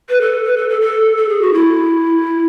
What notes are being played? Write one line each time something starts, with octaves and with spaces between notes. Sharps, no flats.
B4
A4
B4
A4
A4
A4
A4
G#4
F#4
E4